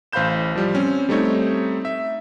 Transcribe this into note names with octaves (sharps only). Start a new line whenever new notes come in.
A1 C5 F5 B5 G6 E7
F3 G3
C4 C#4
G3 A3 C4 D#4 C#5
E5